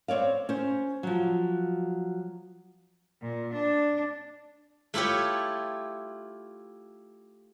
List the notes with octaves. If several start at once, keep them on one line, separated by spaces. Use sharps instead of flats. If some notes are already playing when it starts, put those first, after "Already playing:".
C4 C#5 D5 F5
C#4 C5
F3 F#3
A#2
D4
A3 E4 F4 G4 C#5